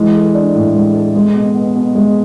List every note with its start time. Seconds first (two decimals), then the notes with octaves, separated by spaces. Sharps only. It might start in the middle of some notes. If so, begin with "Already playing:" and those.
Already playing: E3 G#3
0.14 A4
0.34 D4
0.55 A2
0.74 G#3
0.95 A4
1.15 G#3
1.35 B2
1.55 B3
1.75 B2
1.95 G#3